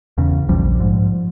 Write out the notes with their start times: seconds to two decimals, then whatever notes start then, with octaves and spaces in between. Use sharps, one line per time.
0.18 E2 C#3
0.49 A#1 F3 G3
0.80 G#2